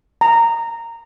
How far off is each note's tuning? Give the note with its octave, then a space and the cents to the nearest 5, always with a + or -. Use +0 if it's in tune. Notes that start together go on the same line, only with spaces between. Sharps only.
A#5 -15